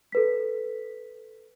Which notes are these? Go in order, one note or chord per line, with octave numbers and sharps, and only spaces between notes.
A4 B4 B6